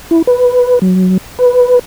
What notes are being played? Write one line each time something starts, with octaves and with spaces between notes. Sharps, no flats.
E4
B4
F#3
B4